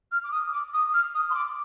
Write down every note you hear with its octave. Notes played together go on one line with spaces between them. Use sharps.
F6
D6
D#6
D6
D#6
F6
D#6
C6
D6